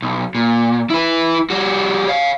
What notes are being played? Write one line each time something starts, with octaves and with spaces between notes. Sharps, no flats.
B1
A#2
E4 B4
G3 F#4
C#5 F5